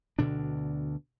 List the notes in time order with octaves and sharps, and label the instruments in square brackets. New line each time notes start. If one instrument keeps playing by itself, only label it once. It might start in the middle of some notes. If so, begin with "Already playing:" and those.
[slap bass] D2 B2 D3 D4